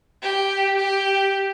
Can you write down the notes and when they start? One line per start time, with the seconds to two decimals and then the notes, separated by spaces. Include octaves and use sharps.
0.23 G4
0.77 G4